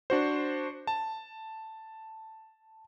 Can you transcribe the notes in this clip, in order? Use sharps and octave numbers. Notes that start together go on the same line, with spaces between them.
D4 F#4 C5
A5